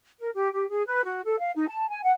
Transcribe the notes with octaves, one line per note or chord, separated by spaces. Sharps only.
A#4
G4
G4
G#4
B4
F#4
A4
F5
D#4
A5
G#5
F#5